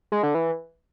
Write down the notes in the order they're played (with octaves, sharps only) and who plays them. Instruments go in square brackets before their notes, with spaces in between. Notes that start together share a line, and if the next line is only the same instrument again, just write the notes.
[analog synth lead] G#3
D3
E3